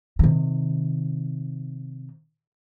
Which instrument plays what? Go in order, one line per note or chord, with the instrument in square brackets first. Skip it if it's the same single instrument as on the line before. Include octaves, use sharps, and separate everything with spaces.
[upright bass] C3 D#3